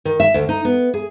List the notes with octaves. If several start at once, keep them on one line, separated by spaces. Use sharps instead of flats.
D#3
E5
D2
D#4
B3
G#4